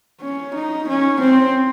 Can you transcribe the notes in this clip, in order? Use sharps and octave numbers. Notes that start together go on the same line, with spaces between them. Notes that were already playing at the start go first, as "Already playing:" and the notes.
C#4
D#4
C#4
C4